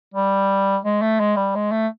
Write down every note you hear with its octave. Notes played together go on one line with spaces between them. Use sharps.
G3
G#3
A3
G#3
G3
G#3
A3